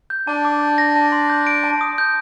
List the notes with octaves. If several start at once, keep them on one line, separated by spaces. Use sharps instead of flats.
G6
D4 A5
D6
G6
A#6
A5
C6
G6
D7
A5
D#6
G6